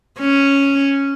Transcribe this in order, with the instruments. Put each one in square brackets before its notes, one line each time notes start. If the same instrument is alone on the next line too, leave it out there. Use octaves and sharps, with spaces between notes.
[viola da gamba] C#4